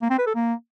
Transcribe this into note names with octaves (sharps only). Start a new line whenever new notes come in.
A#3
C4
B4
A4
A#3